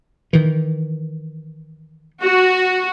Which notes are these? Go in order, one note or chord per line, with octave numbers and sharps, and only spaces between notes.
D#3 E3
F#4